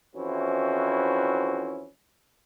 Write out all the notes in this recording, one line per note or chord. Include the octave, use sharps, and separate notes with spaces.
F2 E3 C#4 E4 F#4 C5